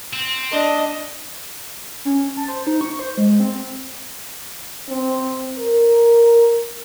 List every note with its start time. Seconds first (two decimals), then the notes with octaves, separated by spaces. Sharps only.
0.13 C4
0.51 D4 D#5
2.05 C#4
2.37 A5
2.48 C5
2.67 D#4
2.81 C#6
2.99 C5
3.18 G#3
3.40 C4
4.89 C4
5.59 A#4